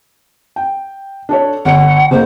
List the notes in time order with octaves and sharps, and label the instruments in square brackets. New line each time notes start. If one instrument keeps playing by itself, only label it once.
[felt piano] G5
D4 A4 C#5
[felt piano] G1 C#7 [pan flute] F#5
[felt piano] F#1 A#3 [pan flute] C5